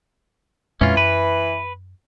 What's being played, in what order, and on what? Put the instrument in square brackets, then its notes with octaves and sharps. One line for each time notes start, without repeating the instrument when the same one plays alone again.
[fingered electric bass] F2 A#2 G#3 [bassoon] E3 [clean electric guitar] C#4 F4
[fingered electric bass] F#2 [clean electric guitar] B4